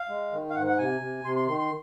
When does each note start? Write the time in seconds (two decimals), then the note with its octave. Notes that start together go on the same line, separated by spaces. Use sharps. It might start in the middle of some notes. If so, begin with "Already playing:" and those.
Already playing: F5
0.09 G#3
0.32 D#3
0.50 F5
0.55 G#2 F#5
0.67 F#5
0.79 C3 G#5
1.01 C3
1.24 C3 C6
1.36 C6
1.47 D#3 C6
1.59 C6